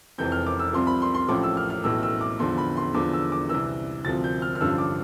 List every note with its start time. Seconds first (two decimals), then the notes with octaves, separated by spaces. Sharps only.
0.18 F1 F2 C3 E3 G6
0.32 F6
0.46 D6
0.59 E6
0.73 C2 C3 F3 C6
0.87 B5
1.02 C6
1.14 C6
1.28 A1 A2 F3 D6
1.43 E6
1.57 F6
1.70 F6
1.84 B1 A2 E3 E6
2.03 E6
2.21 D6
2.39 E2 D3 F3 C6
2.58 B5
2.77 C6
2.94 E2 D3 F3 D6
3.13 E6
3.32 D6
3.49 C2 C3 E3 E6
4.05 D2 C3 F3 A6
4.24 G6
4.42 F6
4.55 F6
4.61 A1 G2 D3 F3 E6
4.78 D6